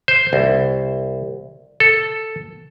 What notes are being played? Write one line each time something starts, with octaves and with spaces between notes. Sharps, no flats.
C5
C2
A4